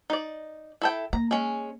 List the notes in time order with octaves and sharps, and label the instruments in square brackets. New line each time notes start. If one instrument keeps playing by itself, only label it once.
[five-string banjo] D#4 D5
E4 A4 G5
[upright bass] A#3 [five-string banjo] A#5
[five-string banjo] G#3 C#4